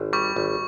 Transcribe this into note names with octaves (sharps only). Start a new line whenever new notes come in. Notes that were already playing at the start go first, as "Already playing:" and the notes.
Already playing: G#1
G3 C#6
G#1